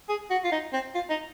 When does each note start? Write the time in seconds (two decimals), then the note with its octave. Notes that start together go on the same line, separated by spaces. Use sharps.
0.09 G#4
0.30 F#4
0.44 F4
0.52 D#4
0.73 C4
0.94 F4
1.10 D#4